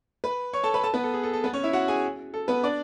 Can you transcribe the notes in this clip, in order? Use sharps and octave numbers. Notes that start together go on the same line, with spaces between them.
B4 B5
C#5 C#6
A4 A5
B4 B5
A4 A5
B3 B4
A4
G#4
A4
A4
B3 B4
C#4 C#5
E4 E5
F#4 F#5
G#4 G#5
A4
B3 B4
D4 D5